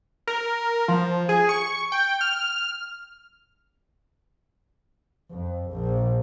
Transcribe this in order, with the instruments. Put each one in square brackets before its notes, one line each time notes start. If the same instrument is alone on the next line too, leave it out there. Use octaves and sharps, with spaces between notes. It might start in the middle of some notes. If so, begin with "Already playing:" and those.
[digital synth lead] A#4
F3
G#4
C#6
G5
F6
[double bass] F2
A#1